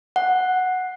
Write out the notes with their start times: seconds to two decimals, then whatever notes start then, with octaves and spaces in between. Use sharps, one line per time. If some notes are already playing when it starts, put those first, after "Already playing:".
0.16 F#5